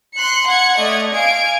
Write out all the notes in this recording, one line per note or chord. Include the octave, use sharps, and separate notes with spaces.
C6 F#6 C#7
F#5 G#6 C#7
A3 D5 D#5 G#6
F5 G#5 G#6 D7